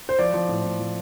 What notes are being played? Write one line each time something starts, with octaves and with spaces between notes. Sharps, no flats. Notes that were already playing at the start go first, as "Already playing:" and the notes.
C5
F3 D5
F3
A2
A2
F3